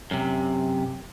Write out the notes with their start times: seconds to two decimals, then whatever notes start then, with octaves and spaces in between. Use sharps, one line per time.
0.11 F#2 C3